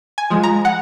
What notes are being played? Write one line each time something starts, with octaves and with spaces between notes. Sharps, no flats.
G#5
F3 G#3
A#5
F#5